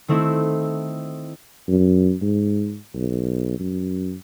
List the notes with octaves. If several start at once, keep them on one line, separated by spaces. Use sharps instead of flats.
D#3 A3 C4 D#4 E4
F#2
G#2
B1
F#2